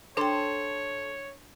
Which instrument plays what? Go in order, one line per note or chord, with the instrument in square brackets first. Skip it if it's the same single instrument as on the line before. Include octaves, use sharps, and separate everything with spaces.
[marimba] D4 G5 [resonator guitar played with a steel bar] A4 C5 [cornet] C#5